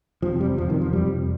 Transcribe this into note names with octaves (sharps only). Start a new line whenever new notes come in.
F2 C3 F3
G3
F2 C3 F3
D#3
F3
F2 C3 G3